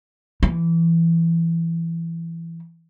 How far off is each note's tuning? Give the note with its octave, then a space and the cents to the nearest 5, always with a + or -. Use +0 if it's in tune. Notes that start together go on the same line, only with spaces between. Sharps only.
E3 +15